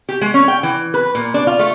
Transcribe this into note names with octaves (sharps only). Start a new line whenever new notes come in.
G4
G#3
C#4
G5
E3
B4
A#2
D4
F4
A3